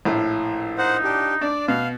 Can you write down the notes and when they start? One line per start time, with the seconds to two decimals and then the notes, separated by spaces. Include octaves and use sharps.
0.05 A#1 A2
0.78 D#4 C5 F#5
1.04 D4 G4
1.41 D4 D5
1.68 B2 F5